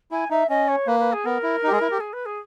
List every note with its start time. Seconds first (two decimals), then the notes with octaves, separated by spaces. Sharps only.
0.11 E4 G#5
0.30 D#4 E5
0.49 C#4 D#5
0.68 C#5
0.87 A#3 B4
0.99 B4
1.12 G#4
1.25 B3 A#4
1.43 E4
1.63 D#4
1.67 G4
1.71 G#3 G#4
1.81 E4
1.91 G4
2.00 G#4
2.13 B4
2.25 G#4